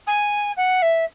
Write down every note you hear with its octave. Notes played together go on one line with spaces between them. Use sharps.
G#5
F#5
E5